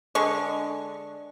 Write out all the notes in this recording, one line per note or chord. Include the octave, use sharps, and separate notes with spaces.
D3 G#3 C#6